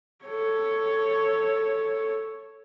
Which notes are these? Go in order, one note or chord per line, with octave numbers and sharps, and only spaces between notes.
A4 C#5